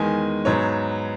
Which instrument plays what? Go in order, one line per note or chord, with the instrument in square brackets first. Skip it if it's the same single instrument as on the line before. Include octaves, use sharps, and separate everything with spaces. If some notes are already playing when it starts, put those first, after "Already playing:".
Already playing: [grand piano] E2 D#3 G#3 G#5
G#2 F#3 B3 C#5